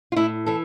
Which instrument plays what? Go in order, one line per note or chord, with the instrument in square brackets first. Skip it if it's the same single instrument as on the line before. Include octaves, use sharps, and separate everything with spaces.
[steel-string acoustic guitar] F4
A2 E4
E3 A4